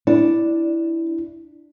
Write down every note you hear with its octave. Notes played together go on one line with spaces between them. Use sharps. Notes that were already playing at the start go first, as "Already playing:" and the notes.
D4 E4